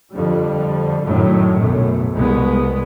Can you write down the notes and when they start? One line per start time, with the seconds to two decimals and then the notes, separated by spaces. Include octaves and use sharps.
0.12 F2 D3 G3
1.03 F#2 A2 D3 D#3 F#3
1.58 B1 F#2 A3
2.14 C2 G#3 B3